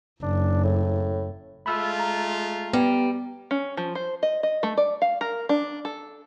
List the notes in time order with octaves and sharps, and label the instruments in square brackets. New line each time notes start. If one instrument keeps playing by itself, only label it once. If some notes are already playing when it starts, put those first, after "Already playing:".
[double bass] F#1 [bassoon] D4
[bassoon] A2
[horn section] G#3 A3 F4 [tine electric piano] B5 E6
[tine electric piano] A#5
[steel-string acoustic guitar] G3 [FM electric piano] B3
[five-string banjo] C#4
F3
C5
D#5
D#5
A3
D5
F5
A#4
D4
A4